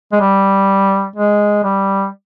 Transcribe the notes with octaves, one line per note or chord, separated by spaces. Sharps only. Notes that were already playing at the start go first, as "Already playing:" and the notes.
G#3
G3
G#3
G3